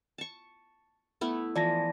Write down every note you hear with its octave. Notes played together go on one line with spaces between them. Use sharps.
A5 C#6
A3 B3 E4
E3 F3 D5 A5 A#6